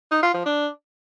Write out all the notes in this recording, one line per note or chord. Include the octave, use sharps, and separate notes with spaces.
D#4
F4
F3
D4